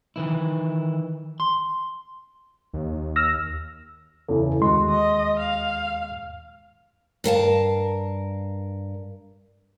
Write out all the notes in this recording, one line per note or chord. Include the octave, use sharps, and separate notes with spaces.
D#3 E3 E4
C6
D#2
E6 F6 A#6
E2 C#3 E4 A4
D#2 G#3 F#4 C6
D#5
F5
G2 A#4 F5 A5